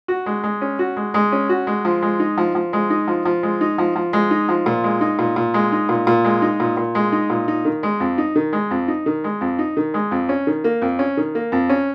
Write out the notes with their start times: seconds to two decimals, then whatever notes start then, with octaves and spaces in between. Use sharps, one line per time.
0.08 F#4
0.26 G#3
0.43 G#3
0.62 C#4
0.79 F#4
0.97 G#3
1.14 G#3
1.32 C#4
1.49 F#4
1.67 G#3
1.85 F3
2.02 G#3
2.20 D#4
2.38 F3
2.55 F3
2.73 G#3
2.90 D#4
3.08 F3
3.25 F3
3.43 G#3
3.61 D#4
3.78 F3
3.96 F3
4.13 G#3
4.31 D#4
4.49 F3
4.66 A#2
4.84 G#3
5.01 D#4
5.19 A#2
5.36 A#2
5.54 G#3
5.72 D#4
5.89 A#2
6.07 A#2
6.25 G#3
6.42 D#4
6.60 A#2
6.77 A#2
6.95 G#3
7.12 D#4
7.30 A#2
7.48 D#4
7.65 D#3
7.83 G#3
8.00 F2
8.18 D#4
8.36 D#3
8.53 G#3
8.71 F2
8.88 D#4
9.06 D#3
9.24 G#3
9.41 F2
9.59 D#4
9.77 D#3
9.94 G#3
10.11 F2
10.29 C#4
10.47 D#3
10.64 A#3
10.82 F2
10.99 C#4
11.17 D#3
11.35 A#3
11.52 F2
11.70 C#4